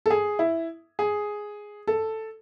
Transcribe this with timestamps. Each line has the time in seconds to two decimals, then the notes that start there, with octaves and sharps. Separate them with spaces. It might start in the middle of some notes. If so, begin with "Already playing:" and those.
0.06 A4
0.10 G#4
0.39 E4
0.99 G#4
1.87 A4